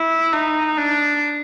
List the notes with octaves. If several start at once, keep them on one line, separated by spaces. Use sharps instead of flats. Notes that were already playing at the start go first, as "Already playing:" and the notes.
Already playing: E4
D#4
D4